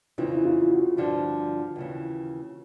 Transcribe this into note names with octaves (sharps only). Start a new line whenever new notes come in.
F2 C#3 E3 F4
E4
F4
F#4
G2 D3 F3
D#2 C#3 E3